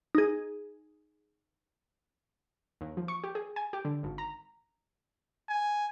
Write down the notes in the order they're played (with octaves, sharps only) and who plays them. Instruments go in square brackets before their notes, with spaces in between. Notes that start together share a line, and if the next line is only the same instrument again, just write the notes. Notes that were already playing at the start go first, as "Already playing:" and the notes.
[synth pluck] D#4 G#4
[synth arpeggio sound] D#2
F3
C#6
G4
G#4
G#5
G4
D3
G#1
A#5
[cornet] G#5